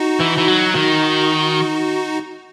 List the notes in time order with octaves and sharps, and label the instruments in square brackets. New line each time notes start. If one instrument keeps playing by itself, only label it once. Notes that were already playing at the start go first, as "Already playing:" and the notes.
Already playing: [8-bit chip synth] D#4 F#4
[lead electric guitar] E3
E3
F#3
D#3